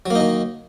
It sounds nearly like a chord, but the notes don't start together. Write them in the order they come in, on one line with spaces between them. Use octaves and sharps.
F#3 A#3 D#4 D#3